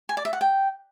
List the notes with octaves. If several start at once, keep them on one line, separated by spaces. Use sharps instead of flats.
G#5
D5
E5
F#5
G5